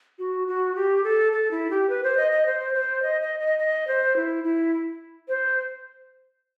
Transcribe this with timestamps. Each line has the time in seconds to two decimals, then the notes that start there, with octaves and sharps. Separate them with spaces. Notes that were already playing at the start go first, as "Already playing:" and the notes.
0.19 F#4
0.48 F#4
0.75 G4
1.04 A4
1.32 A4
1.51 E4
1.70 G4
1.89 B4
2.03 C5
2.17 D#5
2.32 D#5
2.46 C5
2.74 C5
3.02 D#5
3.21 D#5
3.40 D#5
3.59 D#5
3.87 C5
4.16 E4
4.44 E4
5.28 C5